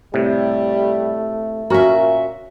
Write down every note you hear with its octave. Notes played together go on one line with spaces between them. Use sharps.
A2 C3 G3 A3
A#2 C#4 F#4 A#4 E5